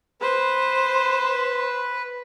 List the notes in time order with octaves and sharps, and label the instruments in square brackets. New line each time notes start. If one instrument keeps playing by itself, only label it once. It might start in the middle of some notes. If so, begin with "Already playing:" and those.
[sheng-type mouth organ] B4 [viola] C5